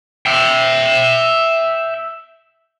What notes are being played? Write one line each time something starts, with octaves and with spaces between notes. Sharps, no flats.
E5 G5